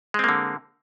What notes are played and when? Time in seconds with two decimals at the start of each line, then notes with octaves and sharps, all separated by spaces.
0.14 G#3
0.19 C4
0.24 A#3
0.29 D3